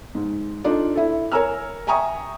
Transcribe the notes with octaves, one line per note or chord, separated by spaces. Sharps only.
G#2
D4 D#4 F4 A4 D5
E4 A4
A#4 C#5 G#5 A#5 E6 F6
E5 G5 G#5 A#5 C#6 D#6